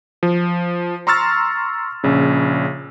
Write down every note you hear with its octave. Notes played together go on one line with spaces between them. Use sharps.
F3
A#5 C6 C#6 E6 F6 A6
A#1 C#3